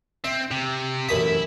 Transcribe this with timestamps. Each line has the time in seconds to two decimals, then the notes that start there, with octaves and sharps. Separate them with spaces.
0.24 C4 E5
0.51 C3
1.09 A1 F#2 E5 B5 D#6